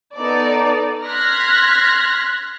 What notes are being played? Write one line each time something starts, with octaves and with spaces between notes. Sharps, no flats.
B3 D#4 A4 D5
C6 F6 F#6 G#6 A#6 B6